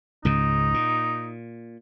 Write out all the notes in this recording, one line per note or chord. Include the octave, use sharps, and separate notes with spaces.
C#2 G#2 C#3 D#4
A#2